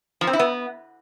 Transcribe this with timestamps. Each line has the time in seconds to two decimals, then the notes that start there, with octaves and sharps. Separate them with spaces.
0.21 F3
0.27 C4
0.33 E4
0.39 B3